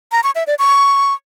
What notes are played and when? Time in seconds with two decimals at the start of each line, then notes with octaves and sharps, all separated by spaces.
0.12 A#5
0.24 C#6
0.35 E5
0.47 D5
0.59 C#6